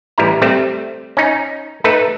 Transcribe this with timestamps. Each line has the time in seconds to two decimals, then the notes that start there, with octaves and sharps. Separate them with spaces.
0.18 A1 G3 E4 A#5
0.42 G3 A3 C4
1.17 C#4 D#4
1.84 A3 D#4 A4 B4